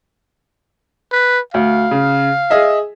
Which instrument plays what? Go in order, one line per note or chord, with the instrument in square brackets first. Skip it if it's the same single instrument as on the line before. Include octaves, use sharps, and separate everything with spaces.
[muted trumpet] B4
[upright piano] D2 [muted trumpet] F5
[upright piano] C#3
G#4 D#5 E5